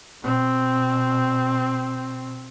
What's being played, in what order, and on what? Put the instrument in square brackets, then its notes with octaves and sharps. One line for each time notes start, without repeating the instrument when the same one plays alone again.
[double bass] B2 C4